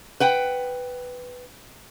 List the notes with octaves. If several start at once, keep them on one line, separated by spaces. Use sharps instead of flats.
B4 F#5 G5